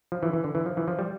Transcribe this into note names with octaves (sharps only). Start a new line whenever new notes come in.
F3
E3
E3
D3
E3
F3
E3
F3
G3